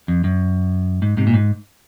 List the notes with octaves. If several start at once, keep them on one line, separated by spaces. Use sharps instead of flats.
F2
F#2
G#2
G#2 C3
A#2
G#2